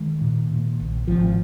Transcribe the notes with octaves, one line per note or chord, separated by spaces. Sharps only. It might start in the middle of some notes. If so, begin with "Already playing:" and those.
Already playing: D#3 G#3
A#2
A#2
A#1
G#1 F3